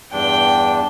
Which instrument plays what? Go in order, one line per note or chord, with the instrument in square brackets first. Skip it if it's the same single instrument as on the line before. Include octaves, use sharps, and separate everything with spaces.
[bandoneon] E2 G2 D4 [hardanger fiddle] G5